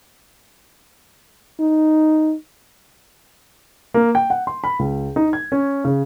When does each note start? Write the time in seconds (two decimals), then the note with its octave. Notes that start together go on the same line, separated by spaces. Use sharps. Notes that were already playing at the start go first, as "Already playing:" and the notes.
1.60 D#4
3.94 A#3
4.15 G5
4.30 F#5
4.47 C6
4.64 B5
4.79 C#2
5.16 D#4
5.33 G#6
5.52 C#4
5.85 C#3